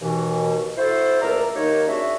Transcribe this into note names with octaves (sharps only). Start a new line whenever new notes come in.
D#2 B2 E3
E4 F#4 A4 C5
C#2 A2 A#4 D5 E5 A#5
D#3 A#3 D#4 G4 C#5 D#5
C#4 D4 F#4 G#4 E5